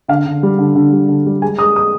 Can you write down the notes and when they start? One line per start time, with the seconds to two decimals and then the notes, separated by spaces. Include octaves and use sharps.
0.08 D3 F5
0.26 D3
0.43 G3
0.58 D3
0.75 D3
0.93 G3
1.09 D3
1.26 G3
1.42 G#3 G#5
1.59 G#3 D#6
1.76 G#3 D#6